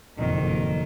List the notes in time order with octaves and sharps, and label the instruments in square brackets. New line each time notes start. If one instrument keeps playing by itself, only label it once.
[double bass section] F#1 F2 [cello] A#2 D#3